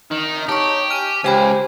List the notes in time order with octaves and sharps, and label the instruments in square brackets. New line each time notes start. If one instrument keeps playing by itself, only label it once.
[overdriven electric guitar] D#3 [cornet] D#4 [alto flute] D#5
[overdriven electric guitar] G4 [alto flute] C#5 [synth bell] A5 C#6
[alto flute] G#5 [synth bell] F6 D#7
[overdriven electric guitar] C#2 [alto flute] G4 [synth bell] C5 G5 B5 [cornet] G#5